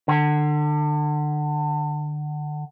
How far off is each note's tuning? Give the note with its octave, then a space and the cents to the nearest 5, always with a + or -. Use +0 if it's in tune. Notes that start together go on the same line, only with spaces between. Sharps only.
D3 +30